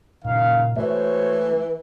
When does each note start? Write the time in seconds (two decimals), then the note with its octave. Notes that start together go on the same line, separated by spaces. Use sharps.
0.25 F#1 A#2 D#3 F5
0.77 E3 A3 F#4 C5 C#5